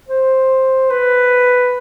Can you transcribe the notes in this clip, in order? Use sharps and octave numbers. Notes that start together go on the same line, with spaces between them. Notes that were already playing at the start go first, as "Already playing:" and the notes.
C5
B4